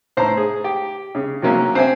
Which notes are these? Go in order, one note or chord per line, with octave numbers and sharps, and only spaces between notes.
A2 C5 A#5
G#4
G4
C#3
C3 F#3 A#3 C#4
C4 C5 E5 G#5